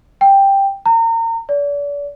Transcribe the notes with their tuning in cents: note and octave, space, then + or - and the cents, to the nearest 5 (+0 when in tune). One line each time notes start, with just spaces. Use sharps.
G5 +5
A#5 -35
D5 -40